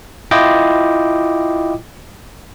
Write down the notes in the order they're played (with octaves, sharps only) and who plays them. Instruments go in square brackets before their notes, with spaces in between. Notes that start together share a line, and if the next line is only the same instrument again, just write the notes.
[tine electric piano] E4 F4 D#5 G5 D6